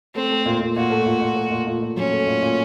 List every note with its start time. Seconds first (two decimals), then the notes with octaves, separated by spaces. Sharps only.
0.15 A3 C4
0.31 A3
0.45 A#2
0.61 A#2
0.76 A#2 F#4
0.91 A3
1.06 A#2
1.21 A#2
1.36 A3
1.51 A#2
1.67 A#2
1.82 A#2
1.96 F#3 C#4
2.12 A3
2.27 A#2
2.42 A#2